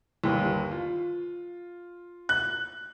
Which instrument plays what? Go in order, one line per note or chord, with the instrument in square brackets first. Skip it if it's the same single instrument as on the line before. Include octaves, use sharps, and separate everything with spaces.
[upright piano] G1 D#2
F4
[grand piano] F#6